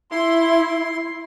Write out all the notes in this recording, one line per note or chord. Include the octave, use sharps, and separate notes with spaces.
E4 C6